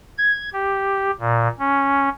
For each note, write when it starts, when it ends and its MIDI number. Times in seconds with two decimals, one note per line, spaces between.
0.18 0.49 92
0.53 1.11 67
1.20 1.48 46
1.59 2.09 61